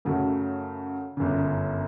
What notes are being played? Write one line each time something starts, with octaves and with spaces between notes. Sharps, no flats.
F#2 C#3 F#3 A3
G1 F#2 C#3